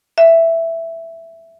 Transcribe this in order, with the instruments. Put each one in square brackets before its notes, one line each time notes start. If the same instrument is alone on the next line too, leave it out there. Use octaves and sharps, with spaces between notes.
[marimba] E5